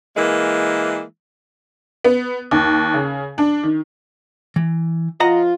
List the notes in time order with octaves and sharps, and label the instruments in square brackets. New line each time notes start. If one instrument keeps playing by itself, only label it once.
[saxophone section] E3 G#3 A#3
[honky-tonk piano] B3
D#2
C#3
D4
D#3
[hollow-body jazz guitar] E3
[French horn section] F3 F4 [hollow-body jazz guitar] D#5 F#5 A#5